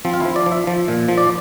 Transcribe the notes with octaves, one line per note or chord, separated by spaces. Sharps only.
F3 C4
F4
E4
F3
D5
F3
E5
F3
A#2
F3
D5